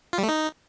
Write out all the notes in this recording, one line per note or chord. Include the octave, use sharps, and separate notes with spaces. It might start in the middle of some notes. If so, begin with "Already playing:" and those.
F4
G3
A3
D#4